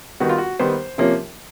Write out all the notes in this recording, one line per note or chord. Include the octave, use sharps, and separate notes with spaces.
D#3 G3 B3 F#4
F4
F#4
D#3 G3 B3 C5
C3 F3 A#3 C#4